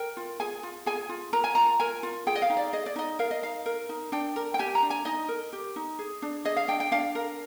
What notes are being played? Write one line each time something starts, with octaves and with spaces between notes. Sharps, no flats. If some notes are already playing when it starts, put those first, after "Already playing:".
Already playing: A#4 G5
F4
G#4 G#5
F4
G#4 G#5
F4
A#4 A#5
G#5
F4 A#5
A#4 G#5
F4
G#4 G5
D#5
F5
D#4
D5
G#4 D#5
D5
D#4 D#5
A#4 F5
D#5
D#4 F5
A#4
D#4
D4 G5
A#4
G5
G4 G#5
A#5
D4
G#5
D#4 D#5
A#4
G4
D#4
G#4
D4
G#4 D#5
F5
D4 G5
G5
D4 F5
A#4